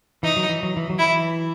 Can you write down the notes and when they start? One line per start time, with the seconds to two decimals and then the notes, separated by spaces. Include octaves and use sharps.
0.23 E3 D#4
0.36 F#3
0.49 E3
0.63 F#3
0.77 E3
0.90 F#3
0.98 E3 E4